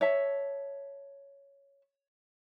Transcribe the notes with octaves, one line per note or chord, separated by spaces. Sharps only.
C#5 E5 A5